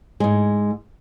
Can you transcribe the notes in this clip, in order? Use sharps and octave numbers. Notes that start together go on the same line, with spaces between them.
G#2 G#3